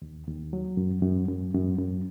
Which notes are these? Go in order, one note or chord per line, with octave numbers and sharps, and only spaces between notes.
D#2
D#2
F#3
F#2
F#2
F#2
F#2
F#2